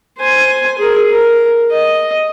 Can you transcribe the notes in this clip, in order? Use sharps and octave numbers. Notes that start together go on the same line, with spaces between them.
C5 G#5
G#4 A#4
A#4
D#5